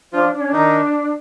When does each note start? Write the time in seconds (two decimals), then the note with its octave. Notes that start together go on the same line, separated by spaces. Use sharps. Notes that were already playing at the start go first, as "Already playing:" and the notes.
0.13 F3 D4 F4
0.33 D4
0.41 C#4
0.48 D#3 D4 D#4